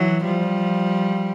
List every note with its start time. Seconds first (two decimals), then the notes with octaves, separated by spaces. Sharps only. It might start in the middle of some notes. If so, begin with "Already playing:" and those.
Already playing: E3 F#3
0.24 F3 G3